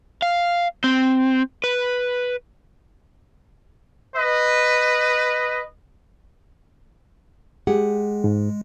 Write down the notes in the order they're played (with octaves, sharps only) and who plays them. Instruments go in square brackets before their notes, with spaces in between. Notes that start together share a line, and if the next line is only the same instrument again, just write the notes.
[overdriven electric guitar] F5
C4
B4
[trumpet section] B4 D#5
[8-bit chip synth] G#3 [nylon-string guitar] G4 G#4 F#5
[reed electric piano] G#2